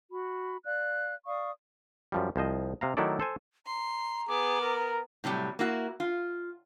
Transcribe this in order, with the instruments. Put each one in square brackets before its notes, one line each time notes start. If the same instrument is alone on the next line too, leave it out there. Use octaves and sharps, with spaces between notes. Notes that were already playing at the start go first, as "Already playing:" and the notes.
[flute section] F#4 B5
D5 F5 F#6
D5 F5 C#6 D#6
[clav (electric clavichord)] F#2 F3 G3
C2 F3 C5 D#5
C3 F5 A#5
D#3 F#3 A3 E4 A4 D5
A4 C5 G#5
[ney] A#5 [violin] C6
[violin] B3 [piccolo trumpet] G#4 [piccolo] D6
[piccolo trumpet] A#4
[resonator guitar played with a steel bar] A2 C3 F#3 G3
A#3 E4 F#4
F4